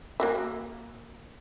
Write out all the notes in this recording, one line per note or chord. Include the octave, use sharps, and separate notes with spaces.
A#3 F#4 E5